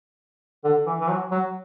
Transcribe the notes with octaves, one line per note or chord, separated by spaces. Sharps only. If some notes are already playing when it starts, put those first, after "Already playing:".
D3
E3
E3
F#3
F#3